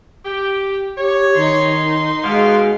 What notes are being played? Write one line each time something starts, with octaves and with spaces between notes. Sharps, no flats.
G4
G4 C#5
D#3 D#4 C6
B2 G#3 F5